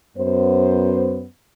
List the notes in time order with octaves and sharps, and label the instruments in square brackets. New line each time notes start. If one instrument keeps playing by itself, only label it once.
[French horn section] F#2 B3 C5